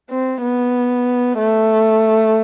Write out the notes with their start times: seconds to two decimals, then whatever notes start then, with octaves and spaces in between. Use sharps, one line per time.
0.10 C4
0.42 B3
1.38 A3